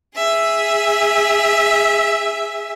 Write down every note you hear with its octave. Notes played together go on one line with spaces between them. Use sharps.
G#4 E5